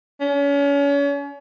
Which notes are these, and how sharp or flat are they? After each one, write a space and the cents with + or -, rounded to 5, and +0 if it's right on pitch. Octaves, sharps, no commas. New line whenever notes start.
C#4 +35